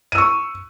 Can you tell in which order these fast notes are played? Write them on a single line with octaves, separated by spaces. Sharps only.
D#7 E6 C#6